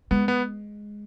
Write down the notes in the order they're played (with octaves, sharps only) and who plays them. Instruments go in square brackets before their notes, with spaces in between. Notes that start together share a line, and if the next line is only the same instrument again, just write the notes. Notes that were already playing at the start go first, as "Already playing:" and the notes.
[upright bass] G#3 [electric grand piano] B3
[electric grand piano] B3